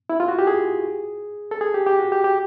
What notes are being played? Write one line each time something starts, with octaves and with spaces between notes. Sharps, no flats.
E4
F4
F#4
G4
G#4
A4
G#4
G4
G4
F#4
G4
G4